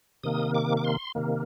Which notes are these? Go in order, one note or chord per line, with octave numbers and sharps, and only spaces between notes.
C3 D#3 A#3 D#6
D6
D6
C6
C3 D#3 A#3